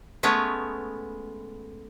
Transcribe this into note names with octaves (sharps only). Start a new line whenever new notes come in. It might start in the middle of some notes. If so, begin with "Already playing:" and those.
G#3 A3 B3 C#4 C#5